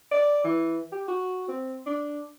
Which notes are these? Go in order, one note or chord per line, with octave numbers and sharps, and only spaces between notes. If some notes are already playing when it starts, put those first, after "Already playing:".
D5
E3
G4
F#4
C4
D4